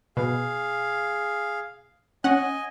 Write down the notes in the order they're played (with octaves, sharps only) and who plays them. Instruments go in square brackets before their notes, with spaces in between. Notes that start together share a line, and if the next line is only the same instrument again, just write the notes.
[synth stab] B2 [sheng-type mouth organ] G#4 F5
[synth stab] C#4 F#5 [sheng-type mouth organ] D#5 G#5